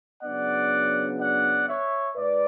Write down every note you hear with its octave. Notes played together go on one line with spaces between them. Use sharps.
C#3 F#3 B3 D4 D5 F#5
D5 F#5
C#5 E5
G#2 B4 D5